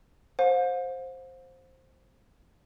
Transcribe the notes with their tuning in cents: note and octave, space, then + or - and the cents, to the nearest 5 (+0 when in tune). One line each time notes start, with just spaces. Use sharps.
C5 +10 F5 +45